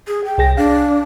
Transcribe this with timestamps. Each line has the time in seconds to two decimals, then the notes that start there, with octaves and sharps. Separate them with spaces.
0.08 G#4
0.25 G5
0.38 C2 G#4 A#6
0.57 D4 F5